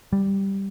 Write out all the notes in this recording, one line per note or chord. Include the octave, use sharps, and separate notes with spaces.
G3